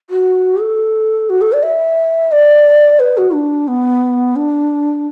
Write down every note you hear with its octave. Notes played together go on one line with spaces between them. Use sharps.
F#4
A4
F#4
A4
D5
E5
D5
B4
F#4
D4
B3
D4